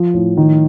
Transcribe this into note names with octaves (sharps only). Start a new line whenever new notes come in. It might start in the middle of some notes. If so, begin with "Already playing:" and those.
Already playing: F3
A2
D#3